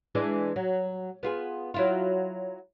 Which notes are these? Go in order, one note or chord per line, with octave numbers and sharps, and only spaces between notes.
E3 G#3 D4
F#3
B3 F4 G#4
F#3 E4 F4